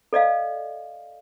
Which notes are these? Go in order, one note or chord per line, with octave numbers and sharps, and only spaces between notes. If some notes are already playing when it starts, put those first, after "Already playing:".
A4 D5 D#5 F5